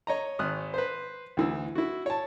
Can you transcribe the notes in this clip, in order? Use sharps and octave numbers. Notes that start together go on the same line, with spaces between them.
C#5 D#5 A#5
G#1 D#6 F6 F#6
B4 C5
D2 E3 E6
E4 F#4
C#5 A5